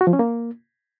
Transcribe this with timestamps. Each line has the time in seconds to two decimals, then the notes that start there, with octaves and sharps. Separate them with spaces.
0.01 F#4
0.07 F3
0.13 C#4
0.19 A#3